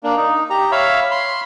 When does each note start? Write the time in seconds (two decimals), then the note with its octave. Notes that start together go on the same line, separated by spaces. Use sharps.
0.04 A#3 D4
0.16 D#4
0.50 G4 A#5
0.72 C#5 E5 F5 B5
1.11 B5 C6